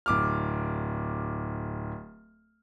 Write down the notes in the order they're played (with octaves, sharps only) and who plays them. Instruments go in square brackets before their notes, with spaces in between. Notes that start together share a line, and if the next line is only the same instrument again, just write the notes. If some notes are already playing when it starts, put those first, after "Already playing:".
[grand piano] D1 D6 F6